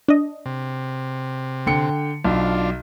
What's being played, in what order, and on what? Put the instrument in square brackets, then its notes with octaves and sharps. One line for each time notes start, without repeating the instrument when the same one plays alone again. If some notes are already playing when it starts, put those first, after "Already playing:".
[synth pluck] D4 D#5
[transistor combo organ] C3
[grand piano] D3 G5 C#7
[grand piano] B1 [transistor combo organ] D4 F4